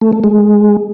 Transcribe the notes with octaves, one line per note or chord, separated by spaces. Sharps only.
A3
A3
G#3